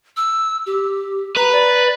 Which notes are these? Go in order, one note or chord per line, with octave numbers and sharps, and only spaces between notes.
E6
G4
B4 A#5
D5